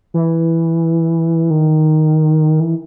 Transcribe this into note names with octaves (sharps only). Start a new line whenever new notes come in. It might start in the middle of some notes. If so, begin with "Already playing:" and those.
E3
D#3
E3